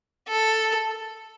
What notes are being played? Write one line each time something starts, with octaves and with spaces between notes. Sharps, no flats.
A4